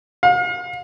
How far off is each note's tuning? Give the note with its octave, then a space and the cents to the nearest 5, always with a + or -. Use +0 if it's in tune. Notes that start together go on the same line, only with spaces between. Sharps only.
F5 +40